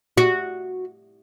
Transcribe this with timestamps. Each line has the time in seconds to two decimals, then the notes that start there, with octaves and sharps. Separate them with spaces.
0.17 F#4